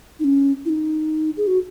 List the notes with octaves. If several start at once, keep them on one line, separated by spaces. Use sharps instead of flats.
D#4
C#4
E4
D#4
G#4
F#4